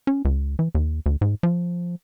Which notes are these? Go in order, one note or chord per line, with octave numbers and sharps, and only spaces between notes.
C#4
C#2
E3
D#2
D2
G#2
F3